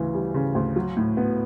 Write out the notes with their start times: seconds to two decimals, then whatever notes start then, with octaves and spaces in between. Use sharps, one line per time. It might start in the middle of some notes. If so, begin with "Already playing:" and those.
Already playing: D2 C#3 E3
0.14 G3
0.34 C#3
0.55 D2
0.76 F#3
0.97 A2
1.17 B3